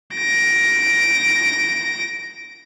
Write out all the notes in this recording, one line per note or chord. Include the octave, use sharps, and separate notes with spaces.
A#6 D7